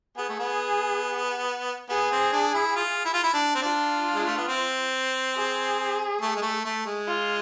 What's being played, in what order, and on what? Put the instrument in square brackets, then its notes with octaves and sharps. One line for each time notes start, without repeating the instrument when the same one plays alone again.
[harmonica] B3 [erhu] G#4
[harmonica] A3
B3
[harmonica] B3 [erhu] G#4
[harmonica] C4
D4
E4
F4
E4
F4
E4
D4
C4
[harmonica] D4 [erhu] F4
[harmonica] G#3
A3
B3
C4
[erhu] G#4
[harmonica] A3
G#3
A3
A3
G#3
[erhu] F4